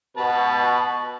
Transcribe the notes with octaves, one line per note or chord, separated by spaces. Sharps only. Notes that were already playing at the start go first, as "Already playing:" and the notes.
B2 B4 A5